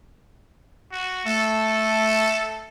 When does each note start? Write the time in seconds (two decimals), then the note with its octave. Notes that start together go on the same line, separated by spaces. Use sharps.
0.92 F#4
1.26 A3 A4